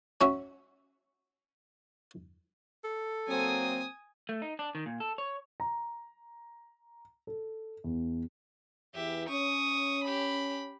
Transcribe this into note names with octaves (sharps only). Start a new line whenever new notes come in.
C#4 F#4 E5
A4
F#3 A#3 C4 G#5 D#6
A3
D#4
D4
D#3
A#2
A4
C#5
A#5
A4
E2
E2 E3 G4 E5
C#4 C#6 D#6
G4 B5